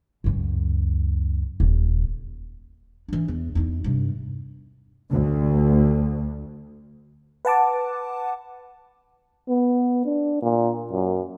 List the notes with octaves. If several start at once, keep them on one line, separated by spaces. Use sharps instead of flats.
C#2 F#2
D#1
E3 D4
E2
E2 D#4
G2 C3
D2
B4 F#5 A5 D6
B3
D4
A#2
F#2